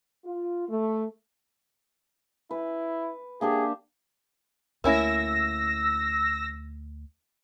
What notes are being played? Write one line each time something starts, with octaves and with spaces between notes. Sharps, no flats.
F4
A3
E4 B4
A#3 D4 G4 G#4
D2 A3 A#3 C#4 E4 E6 A#6